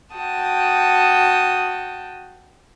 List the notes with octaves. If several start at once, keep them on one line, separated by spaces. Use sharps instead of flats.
F#4 G5 A5 D#6